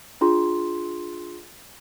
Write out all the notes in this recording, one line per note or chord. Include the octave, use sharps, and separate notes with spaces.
D4 F4 G#4 C6